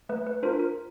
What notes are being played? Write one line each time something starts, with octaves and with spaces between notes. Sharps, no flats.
A3 B4
B4
D4 F4 A#4 C5
A#4